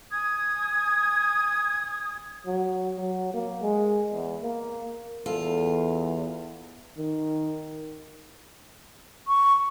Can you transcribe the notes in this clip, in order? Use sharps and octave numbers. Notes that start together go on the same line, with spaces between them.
G#5 D#6 G#6
F#3
F#3
A#3
G#3
E2
A#3
E2 F4 A4
D#3
C#6